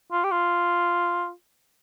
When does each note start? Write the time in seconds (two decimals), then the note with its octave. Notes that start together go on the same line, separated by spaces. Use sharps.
0.12 F4
0.24 G4
0.31 F4